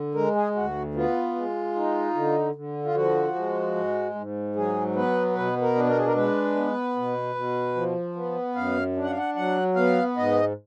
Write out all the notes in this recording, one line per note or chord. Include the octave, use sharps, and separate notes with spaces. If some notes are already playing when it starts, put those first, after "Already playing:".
Already playing: D3
G#3 A#4
G#4
D2 F#4
B3 F4
G#3
D#4
D3
D3
F4
F3 F#4
G#3
G#2
G#2
F#3 G#4
B3 B4
B2 B4
A#4
D4
A#4
G#4
A#4
G#3 B4
B3
B2
B2
F3
B3
F#2 F5
D4
F#5
F5
F#5
F#3 F#5
B3 F5
G#2 D#5